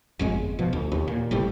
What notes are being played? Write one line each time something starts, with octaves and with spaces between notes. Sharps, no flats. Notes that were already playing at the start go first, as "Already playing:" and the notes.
G1 F2 G#3
B2 F3
D2
D#2
A#2
F#1 A2 C3 G3